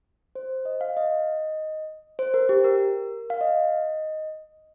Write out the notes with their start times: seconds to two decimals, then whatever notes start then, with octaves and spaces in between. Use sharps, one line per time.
0.35 C5
0.65 D#5
0.81 F5
0.97 D#5
2.19 C5
2.34 A#4
2.49 G4
2.64 A#4
3.30 F5
3.41 D#5